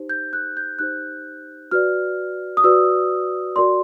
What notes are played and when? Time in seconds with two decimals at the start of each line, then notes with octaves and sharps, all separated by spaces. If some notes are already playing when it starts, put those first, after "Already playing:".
Already playing: D#4 G4 C5
0.09 G6
0.33 F#6
0.57 G6
0.79 D#4 G4 C5 F#6
1.71 F#4 B4 D5 F6
2.57 D#6
2.64 F#4 B4 D5 E6
3.56 F#4 A#4 D5 C6